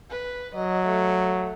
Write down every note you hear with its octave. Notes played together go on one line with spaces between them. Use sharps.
B4
F#3 D#5
A3